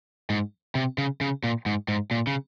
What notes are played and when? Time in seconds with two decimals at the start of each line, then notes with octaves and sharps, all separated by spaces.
0.30 G#2
0.75 C3
0.98 C#3
1.21 C#3
1.44 A#2
1.66 G#2
1.88 G#2
2.11 A#2
2.27 C#3